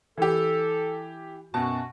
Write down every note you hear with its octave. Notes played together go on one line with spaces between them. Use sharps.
E3 G4 A4
F#2 B2 F#4 A5